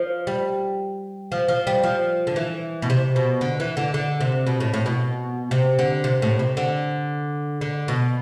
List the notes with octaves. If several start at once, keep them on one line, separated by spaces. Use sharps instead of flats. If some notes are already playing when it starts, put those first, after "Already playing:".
Already playing: F3
G3
F3
F3
G3
F3
D3
E3
B2
C3
B2
D3
E3
D3
D3
C3
B2
A2
A2
B2
C3
D3
C3
A2
C3
D3
D3
B2